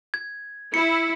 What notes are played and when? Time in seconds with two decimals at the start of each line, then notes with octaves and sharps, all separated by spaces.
0.14 G#6
0.74 E4 C#7